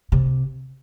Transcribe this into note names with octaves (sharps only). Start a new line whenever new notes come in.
C3